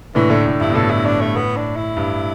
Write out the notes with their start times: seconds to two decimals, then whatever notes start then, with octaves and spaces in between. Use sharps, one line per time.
0.15 A2 D3 E3
0.30 A2 D3 A3
0.46 A2
0.60 G2 E4
0.70 B2
0.75 A2 A4
0.90 E4
1.06 D4
1.21 A3
1.36 B3
1.57 D4
1.76 E4
1.97 G2